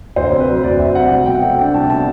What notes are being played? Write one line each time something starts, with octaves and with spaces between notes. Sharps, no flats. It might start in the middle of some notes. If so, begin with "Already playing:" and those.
D2 C5
C3
B4
F#3
D2 D5
D2 E5
C3 F#5
C2
B2 G5
F#5
A3
D4 G5
C2 A5
B2 A5